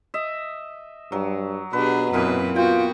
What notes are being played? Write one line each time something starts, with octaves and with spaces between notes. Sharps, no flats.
D#5 E5
G2 F#3
B2 D4 G4 G#4 B4
F#2 A#2 E3 B3 C4 B4
B3 F4 F#4 G5